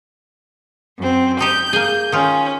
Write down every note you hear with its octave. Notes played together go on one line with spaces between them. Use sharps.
F#2 C4
D#4 G4 G6
A#3 G#4
D#3 C#4 F4